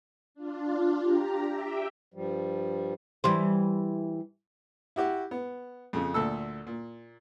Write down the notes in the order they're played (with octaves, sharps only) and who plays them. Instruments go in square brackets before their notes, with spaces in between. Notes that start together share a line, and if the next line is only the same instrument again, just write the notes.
[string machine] D4 F4
G4 A#5
G4 E5 G5
[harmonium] G2 F3 G3
[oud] E3 G3 C5
[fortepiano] E4 F#4 G4
B3
F2 C#3
D2 A#2 A4 E6
A#2